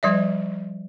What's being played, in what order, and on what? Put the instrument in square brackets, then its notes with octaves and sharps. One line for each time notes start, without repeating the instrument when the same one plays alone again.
[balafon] F3 G3 D5 E5